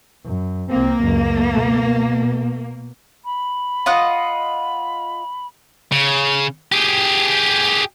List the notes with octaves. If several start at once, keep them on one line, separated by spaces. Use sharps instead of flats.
F#2
C2 A#3 C4
C#2 F#2
B2
B5
F4 D#5 F#5
C#3
G4 G#4